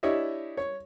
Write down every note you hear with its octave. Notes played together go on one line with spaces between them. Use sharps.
D4 E4 G4 C#5 D#5 E5
C#5